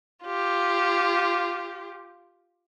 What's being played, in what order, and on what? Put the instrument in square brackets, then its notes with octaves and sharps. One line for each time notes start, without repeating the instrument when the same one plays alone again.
[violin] F4 G4